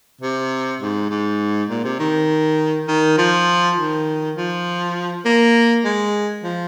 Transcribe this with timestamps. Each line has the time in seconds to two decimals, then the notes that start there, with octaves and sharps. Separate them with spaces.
0.21 C3
0.81 G#2
1.10 G#2
1.70 A#2
1.84 C3
1.99 D#3
2.88 D#3
3.18 F3
3.78 D#3
4.36 F3
5.25 A#3
5.85 G#3
6.44 F3